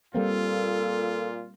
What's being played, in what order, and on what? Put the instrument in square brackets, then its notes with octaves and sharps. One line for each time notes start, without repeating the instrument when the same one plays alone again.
[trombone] A#2 [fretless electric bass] G3 A#3 C4 [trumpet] F4 [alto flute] A4